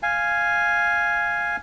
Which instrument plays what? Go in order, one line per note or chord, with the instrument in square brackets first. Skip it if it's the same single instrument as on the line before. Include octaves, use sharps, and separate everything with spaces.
[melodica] F5 G#5